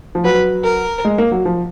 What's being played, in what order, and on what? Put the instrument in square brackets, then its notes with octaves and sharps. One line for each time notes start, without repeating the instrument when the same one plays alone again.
[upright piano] F3
[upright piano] F#3 [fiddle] B4
[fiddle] A#4
[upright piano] G#3
A#3
F#3
F3